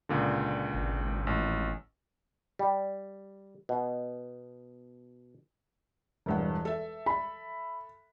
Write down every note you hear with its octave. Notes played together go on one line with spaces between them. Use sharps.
C#2 A#2 D3
G#1
A1
G3
B2
E1 G2 F#5
A4 E5
B5